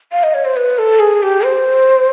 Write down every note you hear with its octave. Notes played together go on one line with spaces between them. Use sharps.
F5
D#5
C#5
C5
B4
A4
G#4
G4
C5